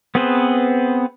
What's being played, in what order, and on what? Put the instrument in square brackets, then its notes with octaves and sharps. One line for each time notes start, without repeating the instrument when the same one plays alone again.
[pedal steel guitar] B3 C4 G#4 B4 C5